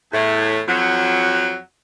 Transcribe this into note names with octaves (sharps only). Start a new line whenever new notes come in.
E2 A2
F2 F#3